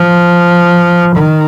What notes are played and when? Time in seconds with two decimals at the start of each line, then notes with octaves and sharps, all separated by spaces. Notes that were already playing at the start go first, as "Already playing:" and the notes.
Already playing: F3
1.16 D#3